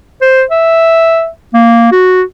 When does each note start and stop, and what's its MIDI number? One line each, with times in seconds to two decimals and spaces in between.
0.21 0.42 72
0.50 1.28 76
1.54 1.91 58
1.92 2.22 66